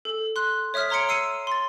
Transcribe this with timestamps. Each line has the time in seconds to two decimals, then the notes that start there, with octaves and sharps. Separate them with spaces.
0.05 A4
0.36 C6 F#6
0.74 C#5 E5 D#6 F6 B6
0.90 C#5 A#5 C6 G#6 C#7 D7
1.09 E6 C7 C#7 D#7
1.47 C6 A6